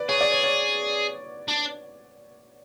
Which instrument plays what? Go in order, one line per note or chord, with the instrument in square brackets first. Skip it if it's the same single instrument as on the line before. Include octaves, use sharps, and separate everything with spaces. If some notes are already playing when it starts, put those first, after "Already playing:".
Already playing: [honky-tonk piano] B4 D5
[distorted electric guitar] G#4 [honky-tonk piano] C#5
[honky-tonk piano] D5
C#5
C#5
[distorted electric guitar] D4